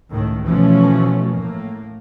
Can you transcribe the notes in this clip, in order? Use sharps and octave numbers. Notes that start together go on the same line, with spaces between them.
C#2 A2 D#3
B2 E3 F3 A3 C#4
A2 A#3